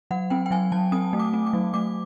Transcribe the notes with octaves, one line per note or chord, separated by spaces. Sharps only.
F#3 F#5
C4 G5
G5
F#3 G#5
F#3 A5
C4 D#6
A3
D6
C4
D6
F#3
A3 D6